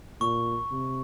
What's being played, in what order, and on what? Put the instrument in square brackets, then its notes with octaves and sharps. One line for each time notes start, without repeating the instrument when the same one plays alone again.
[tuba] A#2 [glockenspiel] C#6
[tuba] C3